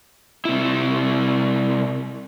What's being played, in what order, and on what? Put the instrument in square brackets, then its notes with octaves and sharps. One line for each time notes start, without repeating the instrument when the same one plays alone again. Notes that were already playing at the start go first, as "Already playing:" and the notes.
[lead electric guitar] C3 E4